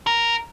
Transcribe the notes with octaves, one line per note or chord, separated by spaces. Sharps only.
A#4